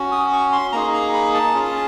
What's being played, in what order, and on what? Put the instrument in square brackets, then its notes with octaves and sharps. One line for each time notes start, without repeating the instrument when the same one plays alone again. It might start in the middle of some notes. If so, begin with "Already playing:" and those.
Already playing: [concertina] C#4 F#4
D#6
C#6
C6
A#3 D#4 G#4 A#5
A#5
B5
A5
C#4 F4 G#4